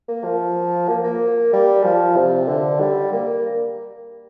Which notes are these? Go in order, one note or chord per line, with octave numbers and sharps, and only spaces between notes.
A#3
F3
A#3
A#3
G3
F3
C3
D3
G3
A#3